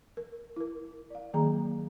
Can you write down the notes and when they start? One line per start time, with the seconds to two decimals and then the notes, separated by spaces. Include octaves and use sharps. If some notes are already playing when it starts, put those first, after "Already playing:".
0.17 A#4
0.56 E4 A#4
1.10 D5 F5
1.34 D#3 F#3 A#3 G#4 A#5